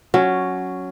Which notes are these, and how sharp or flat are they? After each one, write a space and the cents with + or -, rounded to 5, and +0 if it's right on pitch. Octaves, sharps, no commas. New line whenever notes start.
F#3 +0 C#4 +0